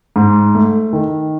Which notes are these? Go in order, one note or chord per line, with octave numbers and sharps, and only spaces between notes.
G#2
A3
D#3